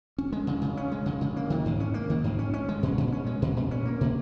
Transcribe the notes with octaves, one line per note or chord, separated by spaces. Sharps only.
C#4
G#3
C#3
C#3
C#4
G#3
C#3
C#3
A#3
D#3
G#2
C#4
A#3
D#3
G#2
C#4
C#4
G#3
A#2
A#2
C#4
G#3
A#2
A#2
C#4
A#3
B2